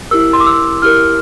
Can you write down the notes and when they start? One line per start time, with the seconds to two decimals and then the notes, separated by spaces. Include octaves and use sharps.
0.11 E4 G4 A#4 E6
0.33 C6
0.40 D6
0.46 E6
0.82 E4 G4 A#4 F6